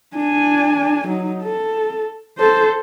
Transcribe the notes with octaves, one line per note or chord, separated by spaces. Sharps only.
D4 G#5
F#3 D#4
A4
A4 C5